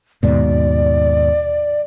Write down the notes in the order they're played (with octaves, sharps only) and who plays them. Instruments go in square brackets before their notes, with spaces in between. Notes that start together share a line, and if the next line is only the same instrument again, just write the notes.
[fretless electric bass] D#2 G#2 B2 [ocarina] D5